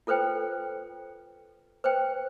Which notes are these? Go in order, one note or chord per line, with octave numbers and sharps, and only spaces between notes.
F4 A4 B4 C5 G5
B4 C5 G5